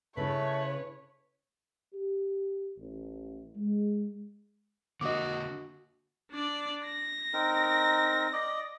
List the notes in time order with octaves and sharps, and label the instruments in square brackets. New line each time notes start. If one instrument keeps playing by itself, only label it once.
[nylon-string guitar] C#3 E4 [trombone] A3 [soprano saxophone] B4 [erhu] C#5
[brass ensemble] G4
A1
G#3
[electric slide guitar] D3 A#3 [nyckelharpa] F#4 [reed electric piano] D#5 D6
[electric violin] D4 D5
A#6
[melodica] C4 D#4 A#4
D5 D#5